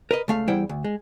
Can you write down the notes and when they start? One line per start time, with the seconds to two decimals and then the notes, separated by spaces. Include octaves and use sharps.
0.11 A#4 B4 D#5
0.28 C#2 A3 F5
0.48 E2 G3 E4 C5 F#5 G5
0.69 D2
0.84 G#3